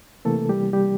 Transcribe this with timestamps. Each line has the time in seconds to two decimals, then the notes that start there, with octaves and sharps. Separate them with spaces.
0.25 C3 E3 A3 A#3 A4
0.49 G3 G4
0.73 G3 G4